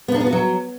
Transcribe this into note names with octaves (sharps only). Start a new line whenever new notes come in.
B3
D4
B3
F#4
F#3